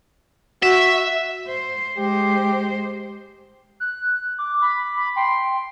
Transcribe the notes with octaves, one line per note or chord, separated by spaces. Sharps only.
F#4 E5
C5
G#3 G4 C5
F#6
D6
B5
B5
G5 C6